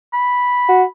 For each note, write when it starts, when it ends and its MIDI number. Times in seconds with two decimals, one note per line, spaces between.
0.13 0.88 83
0.69 0.84 66